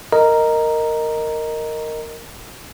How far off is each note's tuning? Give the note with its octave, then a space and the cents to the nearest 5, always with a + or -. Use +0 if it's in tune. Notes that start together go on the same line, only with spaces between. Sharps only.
A#4 -10 D#5 +0 A#5 +0